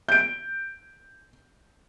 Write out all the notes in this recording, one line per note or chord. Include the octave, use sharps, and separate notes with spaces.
G6 D7